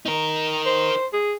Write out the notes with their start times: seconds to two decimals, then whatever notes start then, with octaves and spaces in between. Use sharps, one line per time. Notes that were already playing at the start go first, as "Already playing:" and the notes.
0.06 D#4 A#4
0.66 C5
1.13 G#4